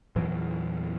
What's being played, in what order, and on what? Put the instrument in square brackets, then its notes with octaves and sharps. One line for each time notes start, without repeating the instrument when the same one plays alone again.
[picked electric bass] E2 A#2 E3 F#3